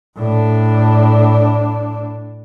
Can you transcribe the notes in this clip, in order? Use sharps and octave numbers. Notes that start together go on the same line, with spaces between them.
A2 D4